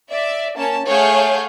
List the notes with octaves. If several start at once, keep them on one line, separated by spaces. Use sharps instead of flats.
D5 E5
A#3 C#4 A5
A3 G#4 C#5 F5 F#5 G6